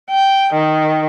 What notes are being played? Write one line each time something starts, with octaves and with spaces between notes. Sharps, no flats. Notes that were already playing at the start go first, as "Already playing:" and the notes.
G5
D#3